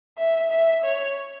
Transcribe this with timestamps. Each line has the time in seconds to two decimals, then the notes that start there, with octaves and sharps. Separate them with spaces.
0.18 E5
0.51 E5
0.84 C#5